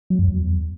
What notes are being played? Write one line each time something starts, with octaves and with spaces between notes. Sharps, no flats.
F#3
F#2
E2